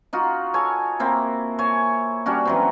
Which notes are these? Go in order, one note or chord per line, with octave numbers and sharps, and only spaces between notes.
D#4 F4 F#4
A4 C#5 G#5
A#3 C4 E4
C5 C#5 G#5
G3 C#4 D4 F#4
E3 F#3 C4